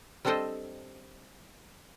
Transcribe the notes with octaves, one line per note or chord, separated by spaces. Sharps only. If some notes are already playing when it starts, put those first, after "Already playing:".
G3 C4 D4 A4 C5 D#5